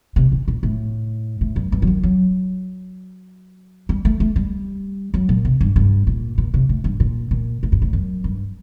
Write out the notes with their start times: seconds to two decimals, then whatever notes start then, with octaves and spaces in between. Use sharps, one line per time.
0.16 C3
0.32 A#2
0.48 A#2
0.63 A2
1.41 A2
1.56 F#2
1.72 G2
1.82 F#3
1.87 D#3
2.03 F#3
3.89 G3
4.05 A3
4.20 A3
4.36 G3
5.14 F#3
5.29 A#2
5.45 C3
5.61 G2
5.76 G2
6.07 A#2
6.38 A#2
6.54 C3
6.69 A2
6.84 G2
7.00 A#2
7.31 A#2
7.63 A2
7.72 G2
7.82 A2
7.93 F#2
8.24 G2